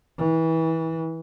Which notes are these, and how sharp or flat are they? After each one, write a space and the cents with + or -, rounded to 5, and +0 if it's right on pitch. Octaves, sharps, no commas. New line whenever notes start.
E3 -25